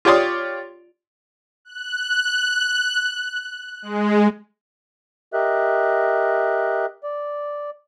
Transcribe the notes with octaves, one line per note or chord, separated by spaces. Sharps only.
F4 G4 C#5 D5 C6 D#6
F#6
G#3
G4 A#4 D#5 E5 F#6
D5